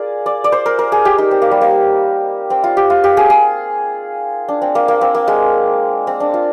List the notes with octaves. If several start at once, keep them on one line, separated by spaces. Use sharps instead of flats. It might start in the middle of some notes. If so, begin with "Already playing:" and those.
Already playing: F4 G#4 A#4 D5
D5
D5
C5
A#4
A#4
G#4
G4
D#4
C4
A#3
G3
A#3
C4
F4
G4
F4
G4
G#4
G#4
D4
C4
A#3
A#3
C4
A#3
G#3
C4
D4
F4